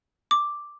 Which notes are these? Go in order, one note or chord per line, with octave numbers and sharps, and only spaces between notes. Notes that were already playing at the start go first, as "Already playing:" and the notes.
D6